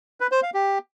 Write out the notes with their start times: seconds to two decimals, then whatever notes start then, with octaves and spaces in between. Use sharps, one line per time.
0.20 B4
0.32 C5
0.43 F5
0.54 G4